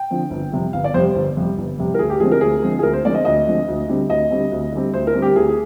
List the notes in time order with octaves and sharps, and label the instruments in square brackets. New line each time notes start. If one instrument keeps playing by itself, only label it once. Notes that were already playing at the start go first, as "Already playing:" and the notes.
Already playing: [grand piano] G5
D3 F3 C4
G1
F2 C3 G3
G1 F5
D5
F2 C3 G3 C5
G1
F2 C3 G3
G1
F2 C3 G3
A#4
D2 G#4
G4
D3 F3 G#3 C4 G#4
A#4
D2 G#4
D3 F3 G#3 C4
G#4
D2 A#4
C5
D3 F3 G#3 C4 D5
D#5
D2 D#5
D3 F3 G#3 C4
D2
D3 G3 C4
D2 D#5
D3 G3 C4
D2
D3 G3 C4
D2 C5
A#4
D3 G3 C4
G4
D2 G#4
G#4